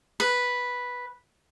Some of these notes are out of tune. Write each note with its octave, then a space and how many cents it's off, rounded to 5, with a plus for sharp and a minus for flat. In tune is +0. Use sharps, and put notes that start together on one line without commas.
B4 -5